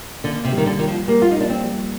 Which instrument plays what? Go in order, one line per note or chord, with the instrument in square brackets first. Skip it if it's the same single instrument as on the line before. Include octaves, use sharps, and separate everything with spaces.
[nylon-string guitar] D3 [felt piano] A#3
[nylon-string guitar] C3
[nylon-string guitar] D#3 [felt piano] G3
[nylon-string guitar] D3
[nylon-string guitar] D#3 [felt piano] F4
[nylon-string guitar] F3
[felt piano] G3 [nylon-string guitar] A#3
[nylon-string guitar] F4
D#4
[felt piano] A#3 [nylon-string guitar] D4
[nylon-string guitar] C4
[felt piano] G3